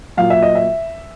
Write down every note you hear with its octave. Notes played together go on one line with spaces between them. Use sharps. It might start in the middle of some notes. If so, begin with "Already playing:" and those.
A#2 F#3 F5
E5
D#5
E5